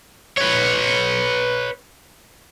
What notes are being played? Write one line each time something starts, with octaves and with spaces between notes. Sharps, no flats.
B4 C#5